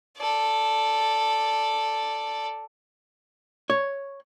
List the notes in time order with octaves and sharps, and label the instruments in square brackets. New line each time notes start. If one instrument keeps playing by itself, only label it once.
[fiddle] A4 D5
[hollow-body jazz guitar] C#5